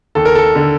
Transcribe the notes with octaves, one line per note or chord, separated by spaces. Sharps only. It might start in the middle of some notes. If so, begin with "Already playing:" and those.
D#2 A4
A#4
A4
D3